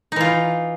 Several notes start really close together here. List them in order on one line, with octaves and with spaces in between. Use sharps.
D#4 E3 F4